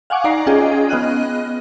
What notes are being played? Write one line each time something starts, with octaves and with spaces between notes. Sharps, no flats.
F5 F#5 G#5 C#6 D6
D#4 D5 A#5 C7
C#4 F4 G#4 D#5 G5
B3 D#5 F6 F#6 D#7